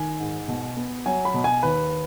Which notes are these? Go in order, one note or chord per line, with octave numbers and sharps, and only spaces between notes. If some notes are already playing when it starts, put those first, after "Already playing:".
Already playing: D#3 G#5
G#2
B2
B3
F#3 G#5
B5
B2
G#5
D#2 B4